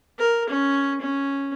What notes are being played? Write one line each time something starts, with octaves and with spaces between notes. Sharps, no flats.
A#4
C#4
C#4